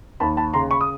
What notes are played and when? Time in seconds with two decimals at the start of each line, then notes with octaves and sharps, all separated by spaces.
0.20 D#2 A5 B5
0.37 A5 B5
0.53 C#3 A#5 C6
0.71 B5 C#6
0.81 D#6